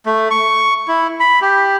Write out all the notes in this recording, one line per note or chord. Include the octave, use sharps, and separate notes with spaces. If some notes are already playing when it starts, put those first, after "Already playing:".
A3
C#6
E4
B5
G4